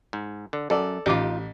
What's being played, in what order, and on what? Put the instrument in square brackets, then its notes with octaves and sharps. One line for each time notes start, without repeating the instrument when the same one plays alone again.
[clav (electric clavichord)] G#2
D3
[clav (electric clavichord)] F#2 [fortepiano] A4 D5
[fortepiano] A1 G4 D6 [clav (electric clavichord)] D#4 F4